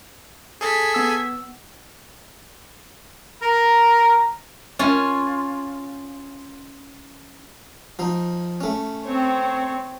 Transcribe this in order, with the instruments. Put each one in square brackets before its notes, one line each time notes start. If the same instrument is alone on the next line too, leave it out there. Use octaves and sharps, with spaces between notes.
[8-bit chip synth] G#4 A4 G#5 [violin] G#6 B6
[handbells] B3 E6
[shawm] A#4 [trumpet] A#5
[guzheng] C#4 F4
[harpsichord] F3 D#4
A3 C#4
[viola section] C4 C#5